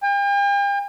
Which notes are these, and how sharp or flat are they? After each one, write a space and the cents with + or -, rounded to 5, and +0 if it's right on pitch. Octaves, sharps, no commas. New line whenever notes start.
G5 +45